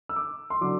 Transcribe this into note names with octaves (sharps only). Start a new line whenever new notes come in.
E6
D6
C6
D3 F#3 D6